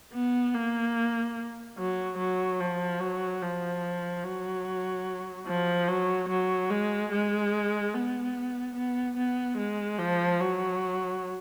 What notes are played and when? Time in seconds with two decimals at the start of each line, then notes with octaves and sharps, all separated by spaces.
0.13 B3
0.55 A#3
1.78 F#3
2.18 F#3
2.60 F3
3.00 F#3
3.42 F3
4.24 F#3
5.47 F3
5.88 F#3
6.29 F#3
6.70 G#3
7.12 G#3
7.94 B3
8.76 B3
9.17 B3
9.57 G#3
9.99 F3
10.41 F#3